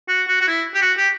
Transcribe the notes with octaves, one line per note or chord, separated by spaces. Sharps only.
F#4
F#4
F#4
E4
G4
F#4
G4